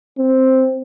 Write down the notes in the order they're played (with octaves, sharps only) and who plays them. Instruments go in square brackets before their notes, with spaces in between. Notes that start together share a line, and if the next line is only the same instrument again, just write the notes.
[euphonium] C4